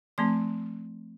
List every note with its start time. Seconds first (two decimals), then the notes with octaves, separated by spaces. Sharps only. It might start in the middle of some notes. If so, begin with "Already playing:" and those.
0.18 F3 A3 C4 C6